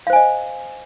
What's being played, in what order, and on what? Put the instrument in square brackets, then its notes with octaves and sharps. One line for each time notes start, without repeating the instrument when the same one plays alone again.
[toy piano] F5
C5
G#5
D#5